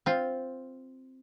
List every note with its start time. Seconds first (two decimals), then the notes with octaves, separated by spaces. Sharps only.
0.06 C4 F4